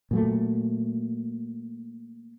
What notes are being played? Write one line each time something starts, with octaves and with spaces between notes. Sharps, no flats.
A#2 F#3 A3